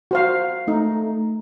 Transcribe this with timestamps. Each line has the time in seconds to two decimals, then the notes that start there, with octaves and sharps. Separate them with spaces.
0.11 F#4 C5 F5
0.68 A3 D#4